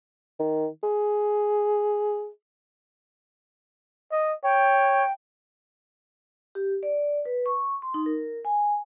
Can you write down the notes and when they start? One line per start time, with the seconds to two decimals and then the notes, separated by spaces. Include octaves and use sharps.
0.39 D#3
0.83 G#4
4.12 D#5
4.44 C#5 G5
6.55 G4
6.83 D5
7.25 B4
7.46 C#6
7.82 C6
7.94 D#4
8.06 A#4
8.45 G#5